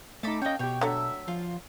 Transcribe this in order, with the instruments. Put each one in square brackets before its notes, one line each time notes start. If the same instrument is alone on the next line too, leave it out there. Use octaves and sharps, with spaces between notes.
[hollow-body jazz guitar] A3 D#4 [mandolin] A5 B5 D6
[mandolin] A#3 G5 [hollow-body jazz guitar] C#4 D#5
[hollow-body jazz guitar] B2 G4 [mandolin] C#5 G5
[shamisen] D3 F#3 A3 [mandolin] E5
[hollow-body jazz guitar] F3 [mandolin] F4